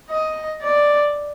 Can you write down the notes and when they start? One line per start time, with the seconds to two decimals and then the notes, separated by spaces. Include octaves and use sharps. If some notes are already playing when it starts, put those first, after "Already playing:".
0.10 D#5
0.62 D5